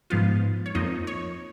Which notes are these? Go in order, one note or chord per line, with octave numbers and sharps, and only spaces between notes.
G#2 F3 B3 F4 F5
C#5
F2 F3 A#3 D#4 D#5
C#5